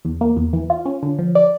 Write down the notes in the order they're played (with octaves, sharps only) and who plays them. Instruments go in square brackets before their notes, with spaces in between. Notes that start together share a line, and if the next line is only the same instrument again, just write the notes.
[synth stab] E2
A#3
E2
E3
F4
C#4
D3
F3
D5